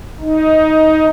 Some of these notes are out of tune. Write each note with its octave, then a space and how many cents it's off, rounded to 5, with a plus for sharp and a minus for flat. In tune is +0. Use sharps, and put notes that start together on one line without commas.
D#4 +10